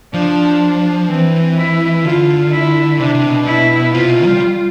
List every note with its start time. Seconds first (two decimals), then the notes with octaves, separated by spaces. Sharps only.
0.14 F3 D4
1.08 E3 C4
1.57 E4
2.04 D3 F4
2.52 E4
2.99 C3 D4
3.15 C3
3.30 B2
3.47 E4
3.93 C3 F4
4.09 B2
4.25 G3